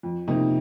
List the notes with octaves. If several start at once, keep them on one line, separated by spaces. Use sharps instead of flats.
F2
C3 F3 A#3 D#4